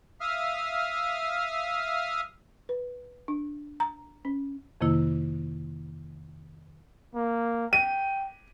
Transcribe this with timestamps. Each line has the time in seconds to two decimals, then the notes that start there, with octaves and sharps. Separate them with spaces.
0.21 E5 F5 D#6 F6
2.69 B4
3.28 D4
3.80 A#5
4.25 C#4
4.81 F2 C3 D#3 A#3 E4
7.14 A#3
7.73 G5 D#7